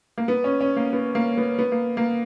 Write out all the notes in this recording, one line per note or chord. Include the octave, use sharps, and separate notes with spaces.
A#3
B3
C#4
C#4
A#3
B3
A#3
B3
B3
A#3
A#3